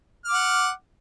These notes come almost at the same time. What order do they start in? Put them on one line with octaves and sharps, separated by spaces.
F6 D6 F#5